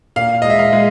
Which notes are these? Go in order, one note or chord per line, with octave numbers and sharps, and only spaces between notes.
A#2 F5
G#3 D#5
E5
F5
G#3